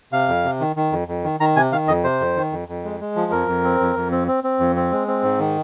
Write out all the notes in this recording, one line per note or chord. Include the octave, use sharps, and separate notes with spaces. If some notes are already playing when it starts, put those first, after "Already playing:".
C3 F5
F2
C3
D#3
D#3
F2
F2
D#3
D#3 A#5
C3 G#5
D#3 F5
F2 D#5
C3 C5
F2
D#3
F2
F2
G#3
G#3
F3
F2 A#4
F2
C4
F2
F2
C4
C4
C4
F2
C4
G#3
C4
G#2
D#3